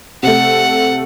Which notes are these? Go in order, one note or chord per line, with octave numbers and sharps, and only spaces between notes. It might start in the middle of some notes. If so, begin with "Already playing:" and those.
C3 A3 F#5